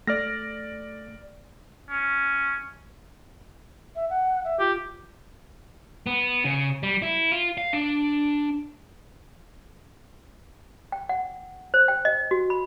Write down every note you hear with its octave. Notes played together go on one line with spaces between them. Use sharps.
A3 D5 F6 A#6
C#4
E5
F#5
E5
F4 G4
B3
C#3
G3
E4
F4
F5
D4
G5
F#5
C5
G5
D#5
F#4
B5